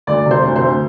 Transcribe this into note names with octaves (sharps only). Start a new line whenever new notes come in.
D2 D5
C3
C5
D2
C5
D2